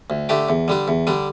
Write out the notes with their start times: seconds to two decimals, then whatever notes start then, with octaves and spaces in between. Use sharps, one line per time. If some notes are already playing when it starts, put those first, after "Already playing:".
0.10 D2
0.29 D3 A3 D4 G4
0.49 E2
0.68 D3 G3 D4
0.88 E2
1.07 D3 G3 D4